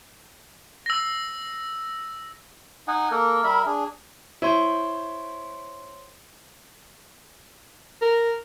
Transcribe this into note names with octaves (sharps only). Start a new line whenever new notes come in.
E6 A#6
D#4 D#5 F#5 G#5
A#3 A4 A#4
G3 A#4 E5 B5
D4 G#4
E4 C5 C#5 C6
A#4